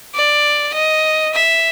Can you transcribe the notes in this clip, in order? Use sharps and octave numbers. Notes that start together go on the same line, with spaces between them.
D5
D#5
E5